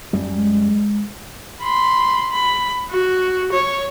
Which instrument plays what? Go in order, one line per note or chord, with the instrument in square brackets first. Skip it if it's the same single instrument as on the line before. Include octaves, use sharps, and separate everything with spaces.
[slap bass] F#2 G3
[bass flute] G#3
[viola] B5 C6
B5
F#4
C#5